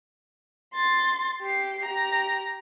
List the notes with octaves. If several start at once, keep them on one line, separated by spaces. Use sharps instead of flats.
C6 A6
G4 C7
G4 A#5